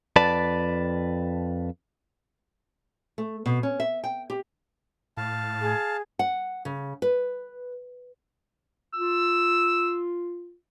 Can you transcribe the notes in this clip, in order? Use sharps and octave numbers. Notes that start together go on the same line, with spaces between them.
F2 B4 D5 A5
A3
B2
C#4
E5
G5
G4
A2 F5 A5
G#4
F#5
C#3
B4
F4 E6